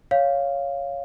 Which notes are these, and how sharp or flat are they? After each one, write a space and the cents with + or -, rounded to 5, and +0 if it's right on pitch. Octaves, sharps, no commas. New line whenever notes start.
C#5 +5 F5 +0